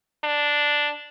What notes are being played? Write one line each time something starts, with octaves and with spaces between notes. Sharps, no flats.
D4